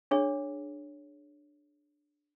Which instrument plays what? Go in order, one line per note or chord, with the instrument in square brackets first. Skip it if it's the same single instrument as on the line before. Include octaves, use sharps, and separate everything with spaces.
[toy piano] D4 G#4 C#5